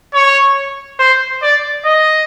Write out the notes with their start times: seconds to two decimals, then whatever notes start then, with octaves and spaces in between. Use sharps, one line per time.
0.14 C#5
0.99 C5
1.42 D5
1.85 D#5